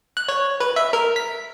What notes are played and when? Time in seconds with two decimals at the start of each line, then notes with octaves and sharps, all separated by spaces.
0.17 F#6
0.28 C#5
0.60 B4
0.76 E5
0.93 A#4
1.16 B6